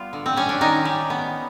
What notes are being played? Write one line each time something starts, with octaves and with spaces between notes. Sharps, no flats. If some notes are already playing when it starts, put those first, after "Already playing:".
Already playing: G3 B3 F4
D3
C4
G3 C#4
D4
D#3 C#4 D#4
G3
B3